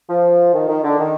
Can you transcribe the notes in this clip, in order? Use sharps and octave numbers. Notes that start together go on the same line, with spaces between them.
F3
D#3
D#3
D3
D#3